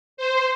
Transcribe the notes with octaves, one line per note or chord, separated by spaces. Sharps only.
C5